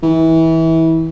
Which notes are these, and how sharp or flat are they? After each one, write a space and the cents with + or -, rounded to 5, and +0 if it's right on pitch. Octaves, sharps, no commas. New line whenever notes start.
E3 -25